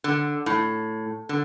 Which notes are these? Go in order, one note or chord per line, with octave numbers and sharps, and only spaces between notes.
D3
A2
D3